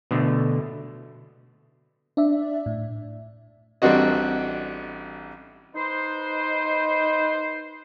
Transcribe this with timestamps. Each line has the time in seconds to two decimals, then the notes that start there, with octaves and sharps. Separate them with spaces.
0.11 B2 D3 A3
2.17 D4 D5 E5
2.66 A2
3.82 A1 G3 C4 D4 F#4 D#5
5.75 D#4 B4 C5